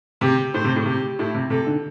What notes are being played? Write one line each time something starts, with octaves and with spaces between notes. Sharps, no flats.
C3 G4
A2 C5
C3
A2
C3 G4
A2 E4
C3
C3 A4
D3